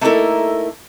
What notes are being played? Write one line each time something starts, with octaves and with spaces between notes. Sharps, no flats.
A3 A#3 D#4 E4 A4 A#4